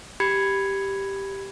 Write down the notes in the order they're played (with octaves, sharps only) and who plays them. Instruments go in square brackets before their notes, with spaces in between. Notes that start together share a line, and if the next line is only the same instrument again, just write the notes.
[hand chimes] G4 B5 G#6 C#7